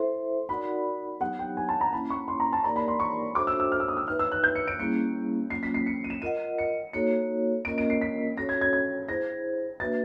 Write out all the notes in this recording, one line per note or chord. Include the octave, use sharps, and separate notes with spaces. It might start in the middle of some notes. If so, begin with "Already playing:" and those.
Already playing: E4 A4 C5 E5 C6
D#4 F#4 A#4 D5 F#5 B5
F#3 B3 D#4 G4 F#5
G5
G#5
A5
A#5
A#3 C#4 E4 B5
C#6
C6
A#5
A5
A#3 D#4 G4 A#4 D5 A#5
B5
C6
C#6
D4 F#4 A4 C5 E5 D6
E6
E6
F6
E6
D#6
E6
D#4 G4 B4 E5 F6
E6
F#6
G6
C#7
D7
G3 A#3 C#4 E4 G#4 C#7
F#3 A#3 C#4 F4 C7
B6
C7
C#7
D#7
E7
F4 A#4 D#5 F#5 D#7
C#7
A#3 D#4 F#4 A4 C#5 C#7
A#3 C#4 F4 A#4 D#5 D7
D7
C7
B6
C#4 F#4 A4 C#5 A#6
G#6
G#6
G#6
E4 G#4 C5 A#6
A#3 D4 F#4 B4 E5 A6